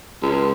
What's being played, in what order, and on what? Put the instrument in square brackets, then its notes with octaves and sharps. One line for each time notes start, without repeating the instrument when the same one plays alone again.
[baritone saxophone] C#2